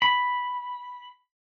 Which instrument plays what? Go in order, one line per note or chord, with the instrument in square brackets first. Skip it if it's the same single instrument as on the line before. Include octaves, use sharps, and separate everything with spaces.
[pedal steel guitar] B5